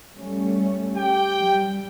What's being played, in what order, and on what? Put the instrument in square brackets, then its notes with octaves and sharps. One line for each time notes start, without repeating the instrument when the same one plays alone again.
[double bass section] G3 A3 C#4
[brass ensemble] G4 G5
[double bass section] G3